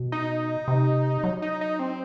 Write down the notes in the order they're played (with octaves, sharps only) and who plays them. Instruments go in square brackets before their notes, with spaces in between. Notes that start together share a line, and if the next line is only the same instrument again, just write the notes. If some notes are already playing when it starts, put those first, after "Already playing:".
Already playing: [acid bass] B2
[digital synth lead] D#4
[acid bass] C3
F#3
[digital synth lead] D#4
D#4
C4